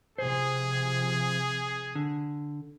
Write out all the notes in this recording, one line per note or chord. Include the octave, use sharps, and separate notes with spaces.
C3 F3 G#4 C5
D3